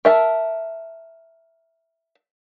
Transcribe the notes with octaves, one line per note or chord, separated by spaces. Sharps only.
A#4 E5 A5